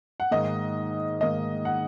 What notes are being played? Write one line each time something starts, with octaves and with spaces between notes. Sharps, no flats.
F#5
G#2 D#3 A#3 D#5
G#2 D#3 A#3 D#5
F#5